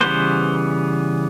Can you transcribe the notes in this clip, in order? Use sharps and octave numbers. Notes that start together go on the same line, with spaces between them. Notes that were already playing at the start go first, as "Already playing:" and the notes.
C#3 E3 G3 B3 C5